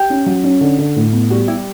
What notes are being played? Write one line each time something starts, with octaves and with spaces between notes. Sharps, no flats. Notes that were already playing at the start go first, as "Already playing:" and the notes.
Already playing: G4
C#4
F#3
C#4
D3
D3
A2
B3
G3 F#4
E4 G4